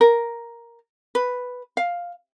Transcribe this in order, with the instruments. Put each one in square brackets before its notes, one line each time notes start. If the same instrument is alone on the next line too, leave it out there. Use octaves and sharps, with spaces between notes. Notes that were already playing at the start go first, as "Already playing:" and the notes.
[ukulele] A#4
B4
F5